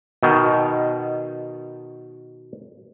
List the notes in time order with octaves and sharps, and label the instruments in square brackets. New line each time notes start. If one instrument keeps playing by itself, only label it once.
[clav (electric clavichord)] B2 D#3